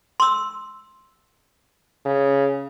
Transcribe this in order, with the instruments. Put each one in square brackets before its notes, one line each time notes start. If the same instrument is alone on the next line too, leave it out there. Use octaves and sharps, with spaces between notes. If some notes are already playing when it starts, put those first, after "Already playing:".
[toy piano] C6 E6
[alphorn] C#3